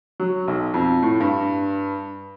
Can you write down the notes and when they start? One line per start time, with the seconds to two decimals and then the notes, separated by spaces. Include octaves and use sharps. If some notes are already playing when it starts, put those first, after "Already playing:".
0.20 F#3
0.48 B1
0.74 F2
1.02 A2
1.20 G2